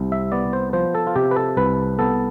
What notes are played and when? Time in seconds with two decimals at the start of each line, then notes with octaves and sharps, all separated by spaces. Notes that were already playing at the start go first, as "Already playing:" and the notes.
Already playing: C2 C3
0.12 E5
0.32 B3 D5
0.53 C5
0.73 F3 C5
0.95 A4
1.07 F4
1.16 C3 G4
1.31 B4
1.36 A4
1.57 C2 B4
1.99 B3 A4